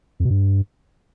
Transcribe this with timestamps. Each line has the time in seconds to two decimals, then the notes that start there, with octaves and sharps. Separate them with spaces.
0.20 F2
0.25 B2
0.30 G2